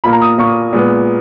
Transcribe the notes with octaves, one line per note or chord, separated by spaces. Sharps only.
A#2 A#3 B5
A#5
D#6
A#2 A#3 C#6
A#2 G#3 B3